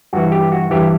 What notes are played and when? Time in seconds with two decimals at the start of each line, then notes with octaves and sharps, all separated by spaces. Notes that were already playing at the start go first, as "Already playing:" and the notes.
0.13 G2 E3 F#4
0.32 G4
0.52 F#4
0.71 G2 E3 G4